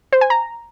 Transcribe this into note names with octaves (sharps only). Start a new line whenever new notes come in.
C5
G#5
A#5